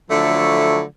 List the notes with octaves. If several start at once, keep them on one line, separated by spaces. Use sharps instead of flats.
D3 F3 F#3 A3 E4